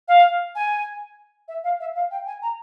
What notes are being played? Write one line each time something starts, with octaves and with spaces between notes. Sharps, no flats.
F5
G#5
E5
F5
E5
F5
G5
G#5
A#5